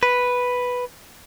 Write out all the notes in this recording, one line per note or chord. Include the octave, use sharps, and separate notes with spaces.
B4